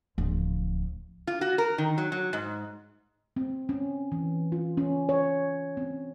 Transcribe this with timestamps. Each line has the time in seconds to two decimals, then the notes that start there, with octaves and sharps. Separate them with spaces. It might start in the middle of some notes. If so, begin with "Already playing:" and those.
0.18 D1 F3
1.27 F4
1.41 F#4
1.58 A#4
1.78 D#3
1.98 F#3
2.12 F#3
2.33 G#2
3.36 C4
3.69 C#4
4.12 E3
4.52 F4
4.77 C#4
5.09 C#5
5.77 C4